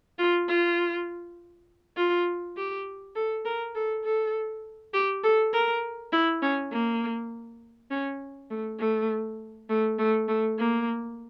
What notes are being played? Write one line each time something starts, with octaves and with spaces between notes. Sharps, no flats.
F4
F4
F4
G4
A4
A#4
A4
A4
G4
A4
A#4
E4
C#4
A#3
C#4
A3
A3
A3
A3
A3
A#3